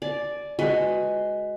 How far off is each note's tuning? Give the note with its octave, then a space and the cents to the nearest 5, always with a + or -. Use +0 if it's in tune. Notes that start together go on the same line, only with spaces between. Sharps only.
D5 +0 G#5 +40
G#3 +0 F#4 +0 B4 +15